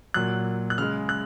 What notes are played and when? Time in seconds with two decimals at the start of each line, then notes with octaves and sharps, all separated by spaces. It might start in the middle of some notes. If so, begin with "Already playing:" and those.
0.14 A#2 F#3 F#6
0.70 F#6
0.78 C#3 G#3 F6
1.09 F#6